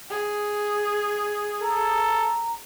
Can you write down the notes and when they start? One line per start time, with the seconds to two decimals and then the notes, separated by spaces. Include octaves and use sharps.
0.10 G#4
1.62 A4 A#5